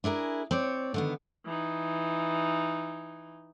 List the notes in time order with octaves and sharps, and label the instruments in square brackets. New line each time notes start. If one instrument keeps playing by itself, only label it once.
[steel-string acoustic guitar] D4 E4 G#4 A#4
C4 C#5 D5
D3 D#3 B3
[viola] E3 D#4